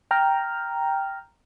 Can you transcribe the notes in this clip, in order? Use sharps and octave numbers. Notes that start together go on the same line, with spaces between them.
G5 A#5 F6